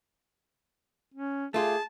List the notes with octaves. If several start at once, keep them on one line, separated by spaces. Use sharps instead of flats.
C#4
A3 F4 G4 G#4 A5